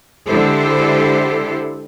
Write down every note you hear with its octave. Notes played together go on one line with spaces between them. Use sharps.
D3 G#3 E4 G4 A4 C5